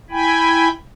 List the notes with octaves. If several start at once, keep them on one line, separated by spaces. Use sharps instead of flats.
E4 G5 G#5 B5